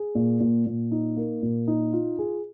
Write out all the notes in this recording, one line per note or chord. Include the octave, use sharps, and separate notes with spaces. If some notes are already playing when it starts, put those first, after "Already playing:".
Already playing: G#4
A#2
A#2
A#2
D#4
A#3
A#2
D#4
F4
G#4